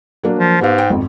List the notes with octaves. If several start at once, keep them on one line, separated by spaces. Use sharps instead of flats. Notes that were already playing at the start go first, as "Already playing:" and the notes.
F#3 A#3 D4
F3
G#2 B3 G4 F5
G5
G#1 F2